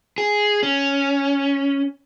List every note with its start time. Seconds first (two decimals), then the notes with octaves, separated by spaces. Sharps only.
0.18 G#4
0.63 C#4